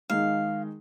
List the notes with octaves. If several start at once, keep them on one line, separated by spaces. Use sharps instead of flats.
D#3 G#3 D#4 F5